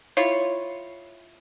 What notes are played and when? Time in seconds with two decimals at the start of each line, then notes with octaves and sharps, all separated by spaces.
0.17 E4 F4 C#5